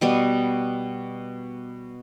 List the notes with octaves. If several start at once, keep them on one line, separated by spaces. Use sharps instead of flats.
B2 G3 B3